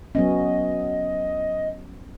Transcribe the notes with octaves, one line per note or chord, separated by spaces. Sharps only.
F#3 B3 C#4 D#5